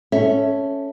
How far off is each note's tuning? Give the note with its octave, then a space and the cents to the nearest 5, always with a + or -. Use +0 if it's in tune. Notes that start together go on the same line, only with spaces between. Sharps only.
C#4 +0 A4 +0 E5 +0